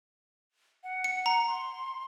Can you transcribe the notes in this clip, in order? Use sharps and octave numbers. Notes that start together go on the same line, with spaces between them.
F#5
C#7
A#5
C6